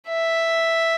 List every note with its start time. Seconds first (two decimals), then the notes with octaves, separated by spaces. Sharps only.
0.08 E5